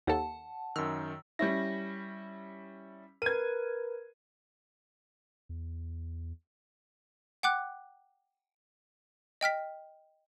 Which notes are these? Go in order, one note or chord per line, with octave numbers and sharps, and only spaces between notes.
D#2 A4 F#5 A5
F#2 D#3 E6 F6
G3 C#4 E4 A#6
A#4 B4 G#6 D#7
E2
F#5 G5 D6 F#6
D#5 G5 F6 B6